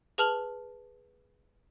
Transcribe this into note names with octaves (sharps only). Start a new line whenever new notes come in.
G#4 B4 A5 F6 F7 F#7